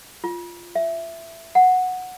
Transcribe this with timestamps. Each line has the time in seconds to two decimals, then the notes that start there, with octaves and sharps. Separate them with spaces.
0.24 F4
0.75 E5
1.55 F#5